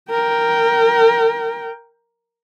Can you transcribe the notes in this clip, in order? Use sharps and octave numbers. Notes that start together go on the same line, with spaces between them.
A#4 G5